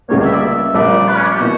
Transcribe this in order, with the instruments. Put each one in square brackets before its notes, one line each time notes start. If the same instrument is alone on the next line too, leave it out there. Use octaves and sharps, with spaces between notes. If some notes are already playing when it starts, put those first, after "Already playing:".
[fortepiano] C#2 C#3 G3 A#3 [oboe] C#5
[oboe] E5
D5
E5
[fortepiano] A#1 A#2 G3 [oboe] D5
[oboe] B4
C#4
D4
G4
[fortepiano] B2 A#3 E4 [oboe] F#4